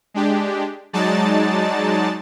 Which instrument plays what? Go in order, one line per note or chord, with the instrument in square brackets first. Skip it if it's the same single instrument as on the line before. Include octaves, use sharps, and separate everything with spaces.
[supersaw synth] G#3 D4 G4
F#3 G#3 D#4 D5 A5 A6